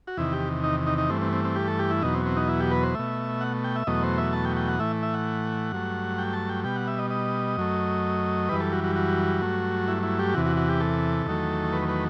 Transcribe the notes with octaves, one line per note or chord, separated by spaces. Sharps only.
F#4
E2 C3 D#3 E4
G4
D#4
D#4
D#4
G2 E3 A3 C4
C4
C4
C4
G4
A4
G4
E4
E2 B2 F#3 D#4
C4
C4
D#4
E4
G4
B4
C5
B2 A3 E5
F#5
G5
E5
E2 B2 F#3 A3 D#5
C5
E5
A5
G5
G5
F#5
A2 E3 A3 E5
E5
F#5
G2 F#3 A3
G5
A5
G5
B2 G3 G5
F#5
E5
D#5
D#5
F#2 F#3 A3
F#2 E3 G3 B4
A4
F#4
F#4
F#4
G2 F#3 A3
E4
E4
G4
E2 C3 E3 F#4
F#4
F#4
G4
A4
E2 D#3 F#3 A3
B4
B4